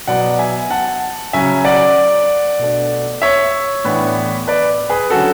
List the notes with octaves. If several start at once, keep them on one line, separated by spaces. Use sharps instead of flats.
B2 F#3 B3 D5 F#5
E5 G#5
F#5 A5
C#3 F#3 C#4 E5 G#5
D5 F#5
B2 A3 D4
C#5 E5
A2 E3 B3 D4
B4 D5
G#4 B4
D3 F#3 C#4 F#4 A4